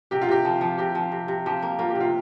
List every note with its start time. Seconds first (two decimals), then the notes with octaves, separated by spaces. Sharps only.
0.11 C3 G4
0.21 F4
0.29 C3 G4
0.45 F3
0.61 F3
0.78 C3 G4
0.95 F3
1.12 C3
1.28 C3
1.46 F3 G4
1.62 A#3
1.79 A#3 F4
1.90 G4
1.95 C3 F4